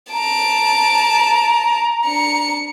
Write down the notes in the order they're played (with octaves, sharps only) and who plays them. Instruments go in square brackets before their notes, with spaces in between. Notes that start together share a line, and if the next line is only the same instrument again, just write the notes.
[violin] A5 D7 [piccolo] A#5
[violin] D4 C#7